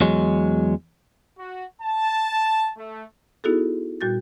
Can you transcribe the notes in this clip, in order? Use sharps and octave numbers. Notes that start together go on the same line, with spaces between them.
E2 F#3 G#3
F#4
A5
A3
B3 D#4 E4 F#4 G#4 A4
A#2 G3 F#4 G6 A6